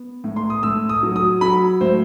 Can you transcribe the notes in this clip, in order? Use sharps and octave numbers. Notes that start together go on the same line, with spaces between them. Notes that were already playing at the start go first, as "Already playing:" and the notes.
Already playing: B3
A2
C6
D#6
A2 E6
D#6
F#3
D#6
F#3 B5
A2 C5